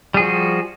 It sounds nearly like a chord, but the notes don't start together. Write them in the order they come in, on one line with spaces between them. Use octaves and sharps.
G3 G#4 F3 F#4